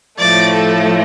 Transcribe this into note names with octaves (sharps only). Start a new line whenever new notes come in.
A2 F3 A3 D5
A4